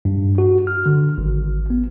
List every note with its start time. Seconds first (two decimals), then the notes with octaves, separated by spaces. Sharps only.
0.05 G2
0.38 F#4
0.67 F6
0.86 D3
1.18 G#1
1.70 B3